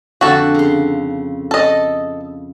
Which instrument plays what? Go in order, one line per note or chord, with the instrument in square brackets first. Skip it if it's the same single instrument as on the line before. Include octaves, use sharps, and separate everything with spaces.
[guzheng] F2 D3 [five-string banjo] F#4 A4
[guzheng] C#3 C6
[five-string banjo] A4 D#5